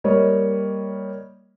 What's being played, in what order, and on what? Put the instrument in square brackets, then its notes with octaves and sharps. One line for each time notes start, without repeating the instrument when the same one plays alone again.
[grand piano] G3 A#3 C#5 D#5